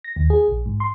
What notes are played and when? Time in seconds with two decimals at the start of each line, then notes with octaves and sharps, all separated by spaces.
0.04 A#6
0.16 D#2
0.30 G#4
0.48 A#1
0.66 G#2
0.80 C6